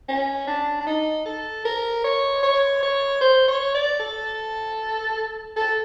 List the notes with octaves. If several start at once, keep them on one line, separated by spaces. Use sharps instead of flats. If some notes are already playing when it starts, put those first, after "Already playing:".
C#4
D4
D4
D#4
A4
A#4
C#5
C#5
C#5
C5
C#5
D5
A4
A4